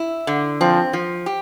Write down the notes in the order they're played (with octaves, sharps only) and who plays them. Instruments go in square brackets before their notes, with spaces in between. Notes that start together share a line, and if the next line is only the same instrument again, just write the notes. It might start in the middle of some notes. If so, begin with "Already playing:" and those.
Already playing: [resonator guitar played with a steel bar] E4
D3
[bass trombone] F3 [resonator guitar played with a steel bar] C4
[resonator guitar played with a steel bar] F3
G4